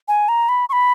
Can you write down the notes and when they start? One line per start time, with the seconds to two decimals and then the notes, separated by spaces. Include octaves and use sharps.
0.08 G#5
0.29 A#5
0.49 B5
0.69 C#6
0.73 B5